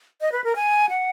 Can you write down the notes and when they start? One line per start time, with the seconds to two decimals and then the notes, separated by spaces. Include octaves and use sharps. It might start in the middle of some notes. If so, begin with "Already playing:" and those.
0.21 D#5
0.32 B4
0.44 A#4
0.56 G#5
0.89 F#5